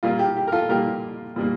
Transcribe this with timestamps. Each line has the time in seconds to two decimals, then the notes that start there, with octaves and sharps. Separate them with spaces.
0.03 A#2 G3 A#3 F4
0.19 G4
0.37 G4
0.48 A#4
0.52 F4 A4
0.69 A#2 G3 A#3 G4 A#4
1.36 A#2 G3 A#3